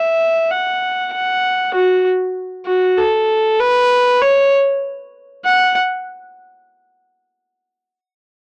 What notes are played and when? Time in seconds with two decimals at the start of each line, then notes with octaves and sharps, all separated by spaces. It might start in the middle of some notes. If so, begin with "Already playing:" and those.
Already playing: E5
0.51 F#5
1.13 F#5
1.74 F#4
2.67 F#4
2.98 A4
3.60 B4
4.22 C#5
5.45 F#5